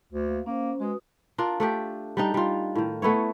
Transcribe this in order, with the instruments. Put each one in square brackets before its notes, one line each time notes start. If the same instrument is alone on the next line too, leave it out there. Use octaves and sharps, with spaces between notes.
[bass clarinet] D2
[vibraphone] A#3 F5
[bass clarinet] A#3 [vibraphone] C#4 C5
[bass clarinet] G#3 [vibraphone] F#4 B4 D#6
[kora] D4 F4 A#4
A3 D4 G4
G3 D4 D#4
G3 F4
A2 D#3
A3 B3 E4 C#5